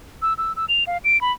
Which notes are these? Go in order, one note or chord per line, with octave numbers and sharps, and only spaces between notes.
E6
E6
E6
F7
F5
D7
B5